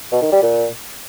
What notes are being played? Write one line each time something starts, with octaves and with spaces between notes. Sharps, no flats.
B2
D#3
G3
A#2